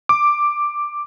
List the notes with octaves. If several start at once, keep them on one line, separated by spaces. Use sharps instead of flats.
D6